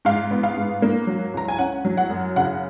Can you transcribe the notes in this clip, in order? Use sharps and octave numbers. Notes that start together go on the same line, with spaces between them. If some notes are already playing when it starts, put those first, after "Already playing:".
G#2 F5
B3
F5
G#2
A#3
F#3
C#2 A#5
G#5
C#4 F#5
F#3
F#5
F#2
C#3 F#5